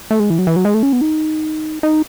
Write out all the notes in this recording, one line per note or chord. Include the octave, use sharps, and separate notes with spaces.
A3
G#3
E3
F#3
E3
F#3
G#3
A3
C#4
B3
D#4
D#4